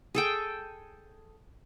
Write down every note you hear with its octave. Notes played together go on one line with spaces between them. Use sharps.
G#4 A4 G5